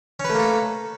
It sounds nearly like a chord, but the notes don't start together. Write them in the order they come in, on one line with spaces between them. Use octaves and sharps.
C#4 B4 A3 A#3 A4